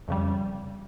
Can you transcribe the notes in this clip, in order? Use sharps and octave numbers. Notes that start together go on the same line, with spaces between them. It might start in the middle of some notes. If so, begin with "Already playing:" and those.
F2 C#3 G3